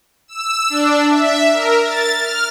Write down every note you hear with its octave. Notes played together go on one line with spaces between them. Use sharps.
E6
D4
E5
A#4
A6
F6